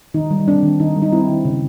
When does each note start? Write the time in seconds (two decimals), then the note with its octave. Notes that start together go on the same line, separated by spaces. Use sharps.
0.14 D#3 D#4
0.31 G3
0.48 C4 D4
0.63 D#3
0.80 D#3 D#4
0.96 G3
1.02 D#4
1.12 C4 E4
1.29 D#3
1.45 C#3